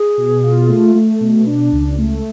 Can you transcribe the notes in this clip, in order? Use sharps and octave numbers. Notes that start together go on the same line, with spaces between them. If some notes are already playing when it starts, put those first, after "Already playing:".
Already playing: G#4
B2
F4
A3
A3
B2
D4
C#2
A3